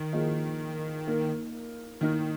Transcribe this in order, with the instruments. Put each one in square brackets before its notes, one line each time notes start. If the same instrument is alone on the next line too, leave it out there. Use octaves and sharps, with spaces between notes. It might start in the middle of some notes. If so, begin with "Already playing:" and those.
Already playing: [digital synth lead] D#3
[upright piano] F3 A#3 G#4 D#5
A#3 D#4 A#4
[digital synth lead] D#3 [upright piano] A#3 D#4 A#4